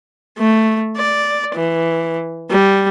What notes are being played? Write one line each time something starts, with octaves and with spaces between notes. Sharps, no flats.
A3
D5
E3
G3